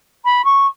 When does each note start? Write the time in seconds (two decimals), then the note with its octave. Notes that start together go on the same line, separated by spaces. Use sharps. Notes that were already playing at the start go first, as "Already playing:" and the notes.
0.24 B5
0.45 C#6